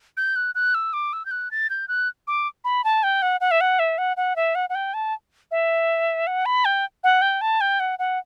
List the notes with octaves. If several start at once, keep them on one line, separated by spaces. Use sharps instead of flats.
G6
F#6
F#6
E6
D6
E6
G6
F#6
A6
G6
F#6
D6
B5
A5
G5
F#5
F#5
E5
F#5
E5
F#5
F#5
E5
F#5
F#5
G5
A5
E5
F#5
B5
G5
F#5
G5
A5
G5
F#5
F#5